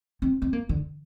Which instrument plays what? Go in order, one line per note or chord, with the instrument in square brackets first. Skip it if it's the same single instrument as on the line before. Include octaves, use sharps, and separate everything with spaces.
[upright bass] C4
C4
A#3
D3